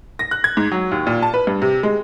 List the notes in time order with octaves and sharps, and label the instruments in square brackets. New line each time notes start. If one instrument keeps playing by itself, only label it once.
[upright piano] A#6
F#6
G#6
G#2
F#3
D#2
A#2
A5
B4
G2
C3
G#3